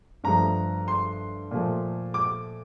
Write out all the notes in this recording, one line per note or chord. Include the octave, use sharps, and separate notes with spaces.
G2 F3 A3 A#5
C6
A#2 F3 A3
D6